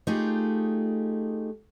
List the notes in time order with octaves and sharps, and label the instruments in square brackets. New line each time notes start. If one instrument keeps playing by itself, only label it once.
[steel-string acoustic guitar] A3 D#4 F4 G4 G#4